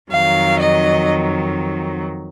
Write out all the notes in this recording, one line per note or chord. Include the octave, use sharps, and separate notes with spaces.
F2 D#3 F#3 F5
D#5